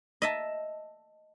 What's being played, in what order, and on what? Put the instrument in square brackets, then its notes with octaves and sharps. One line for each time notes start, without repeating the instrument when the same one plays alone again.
[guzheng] D#5 E5 A5